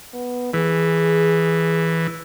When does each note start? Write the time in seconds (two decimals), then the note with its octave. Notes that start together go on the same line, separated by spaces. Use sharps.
0.14 B3
0.54 E3 G#4